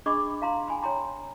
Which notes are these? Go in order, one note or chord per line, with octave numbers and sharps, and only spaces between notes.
D4 G#4 D#5 B5 C#6 D6
F5 A#5 C6
G5 G#5 B5
C#5 G5 A#5 C6